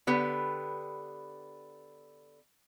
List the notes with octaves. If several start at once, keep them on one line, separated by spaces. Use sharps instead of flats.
D3 B3 G4 B4